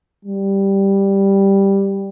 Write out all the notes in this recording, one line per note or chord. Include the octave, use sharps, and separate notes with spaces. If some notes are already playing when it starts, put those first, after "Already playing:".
G3